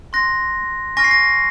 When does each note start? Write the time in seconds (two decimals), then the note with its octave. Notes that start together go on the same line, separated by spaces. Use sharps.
0.13 C6 F#6 A#6
0.97 G#5 C#6 F6 A#6
1.04 C7
1.11 A#6